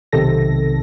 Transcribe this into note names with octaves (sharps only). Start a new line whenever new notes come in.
B1 C3 D#3 A4 A#6